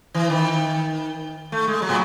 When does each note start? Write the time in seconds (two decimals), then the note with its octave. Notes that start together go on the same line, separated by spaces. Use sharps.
0.14 E3
0.30 D#3
1.52 A3
1.67 G#3
1.82 F#3
1.89 A2